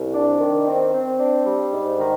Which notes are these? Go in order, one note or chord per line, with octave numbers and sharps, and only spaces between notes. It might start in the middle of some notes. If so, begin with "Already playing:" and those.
Already playing: C2
D4
D#3
C4
C4
D4
G3
G#2
D#3